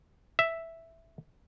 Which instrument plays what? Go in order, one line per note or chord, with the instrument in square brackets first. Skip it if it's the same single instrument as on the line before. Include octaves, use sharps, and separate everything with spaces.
[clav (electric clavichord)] E5